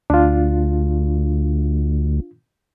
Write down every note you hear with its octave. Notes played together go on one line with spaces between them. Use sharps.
D2 D4 F4